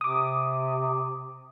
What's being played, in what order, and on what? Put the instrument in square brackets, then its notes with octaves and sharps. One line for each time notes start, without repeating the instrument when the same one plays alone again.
[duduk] C3 [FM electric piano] D6 D#6